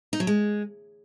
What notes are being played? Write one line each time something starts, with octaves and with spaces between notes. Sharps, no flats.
D#4
F#3
G#3